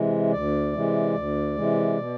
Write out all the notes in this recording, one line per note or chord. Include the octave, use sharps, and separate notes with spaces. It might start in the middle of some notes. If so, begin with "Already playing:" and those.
Already playing: C3 E3 G#3
D2 D5
C3 E3 G#3
D2
C3 E3 G#3
B2